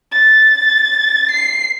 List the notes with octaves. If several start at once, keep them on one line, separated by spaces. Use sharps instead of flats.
A6
C7